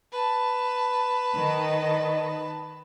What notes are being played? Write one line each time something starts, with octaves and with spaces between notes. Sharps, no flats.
B4 A5
D#3 D#5